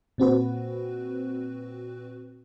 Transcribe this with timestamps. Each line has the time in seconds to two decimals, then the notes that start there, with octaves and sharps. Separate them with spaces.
0.18 A#2 C4 F#4 B4